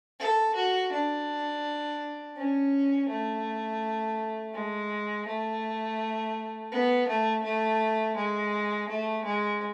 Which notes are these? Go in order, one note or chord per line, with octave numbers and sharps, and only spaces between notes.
A4
F#4
D4
C#4
A3
G#3
A3
B3
A3
A3
G#3
A3
G#3